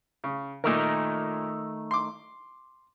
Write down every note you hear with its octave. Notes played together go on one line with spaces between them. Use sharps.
C#3
A#2 D#3 A3 A#3 D#4 A#4
C6 D6